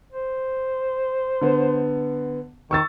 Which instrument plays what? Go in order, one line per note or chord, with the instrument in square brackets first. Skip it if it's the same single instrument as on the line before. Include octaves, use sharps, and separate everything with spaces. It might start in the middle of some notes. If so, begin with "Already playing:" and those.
[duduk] C5
[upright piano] D3 B3
[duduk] D#3 [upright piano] C#6 E6 A6